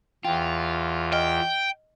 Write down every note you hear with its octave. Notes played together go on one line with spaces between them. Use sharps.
E2 F4 G5
D#5 G5 F6